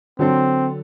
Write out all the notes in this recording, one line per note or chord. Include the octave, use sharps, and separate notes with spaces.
D3 F#3 C4 A4